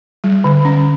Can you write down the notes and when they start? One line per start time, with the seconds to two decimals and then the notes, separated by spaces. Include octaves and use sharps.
0.24 G3
0.44 D3
0.65 C#4